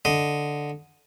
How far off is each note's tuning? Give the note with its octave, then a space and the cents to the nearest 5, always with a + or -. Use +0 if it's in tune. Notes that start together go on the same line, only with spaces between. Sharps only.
D3 +0 D#5 +0